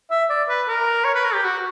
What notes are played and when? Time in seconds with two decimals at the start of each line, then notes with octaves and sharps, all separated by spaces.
0.11 E5
0.29 D5
0.49 B4
0.68 A#4
1.04 C#5
1.14 B4
1.24 A#4
1.33 G4
1.44 F#4